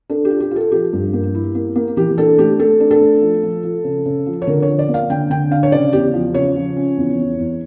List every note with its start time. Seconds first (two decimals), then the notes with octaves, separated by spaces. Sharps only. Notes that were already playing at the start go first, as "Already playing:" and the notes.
0.10 D4 A4
0.25 G4
0.30 F4
0.40 G4
0.51 F4 A4
0.71 F3 G4
0.93 G2
1.13 A#3
1.35 E4
1.55 A#3
1.76 A#3
1.97 E3 G4
2.18 D4 A4
2.38 A3 G4
2.60 A3 A4
2.80 D4
2.91 A4
3.01 A3
3.22 F3
3.43 F3
3.64 F3
3.84 C#3
4.06 C#3
4.26 F3
4.42 C#5
4.47 D3 A#4
4.63 C#5
4.68 F3
4.79 D5
4.89 A#3
4.94 F5
5.10 D3 G5
5.30 D3 G5
5.51 D4 F5
5.63 C#5
5.72 C#3 D5
5.93 E2 G4
6.14 F3
6.34 C#3 C#5
6.56 F3
6.76 C#4
6.97 E2
7.18 E2
7.39 E2